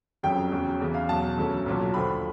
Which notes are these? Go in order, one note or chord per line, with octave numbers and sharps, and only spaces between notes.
F#1 F2 C#3 F#3 G5
E2 C#3 F#3
E2 C#3 E3
F5
E2 B2 F#3 A5
D2 C#3 F#3
B1 A#2 F#3
D#2 D3 F3 B5